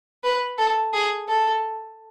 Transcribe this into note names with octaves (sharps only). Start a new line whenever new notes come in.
B4
A4
G#4
A4